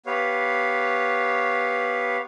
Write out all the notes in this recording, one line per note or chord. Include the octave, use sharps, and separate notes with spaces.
B3 G4 B4 C#5 F5